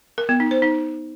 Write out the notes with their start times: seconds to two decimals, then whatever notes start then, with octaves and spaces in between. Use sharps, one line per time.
0.18 A#4
0.29 B3
0.40 D#4
0.51 C5
0.62 D#4